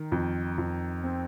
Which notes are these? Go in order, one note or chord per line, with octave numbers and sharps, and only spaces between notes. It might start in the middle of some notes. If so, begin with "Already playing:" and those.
Already playing: D#3
F2
F2
C4